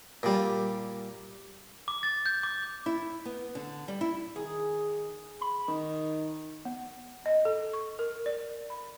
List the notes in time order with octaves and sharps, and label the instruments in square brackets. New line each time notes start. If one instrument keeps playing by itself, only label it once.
[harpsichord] A#2 G3
[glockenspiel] D6
A6
G6
D6
[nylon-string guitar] E4
B3
D3
G3
E4
[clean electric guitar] D#3 [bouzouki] G#4
[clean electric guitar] B5
[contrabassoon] D#3
[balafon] B3
D#5
A4
C#6
A#4
D5
B5